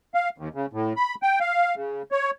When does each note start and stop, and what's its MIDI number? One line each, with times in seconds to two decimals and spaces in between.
0.14 0.29 77
0.38 0.49 39
0.55 0.66 49
0.73 0.93 45
0.96 1.15 83
1.22 1.39 79
1.40 1.75 77
1.76 2.02 49
2.11 2.30 73